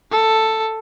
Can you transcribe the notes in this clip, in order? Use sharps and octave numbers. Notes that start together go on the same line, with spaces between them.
A4